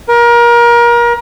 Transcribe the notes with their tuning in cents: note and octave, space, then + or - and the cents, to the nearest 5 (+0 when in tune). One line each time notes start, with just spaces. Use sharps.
A#4 +30